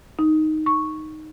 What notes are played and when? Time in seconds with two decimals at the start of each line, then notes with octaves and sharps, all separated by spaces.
0.19 D#4
0.66 C#6